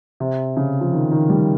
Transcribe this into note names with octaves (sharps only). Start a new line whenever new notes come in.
C3
C#3
F3
D#3
D#3
G3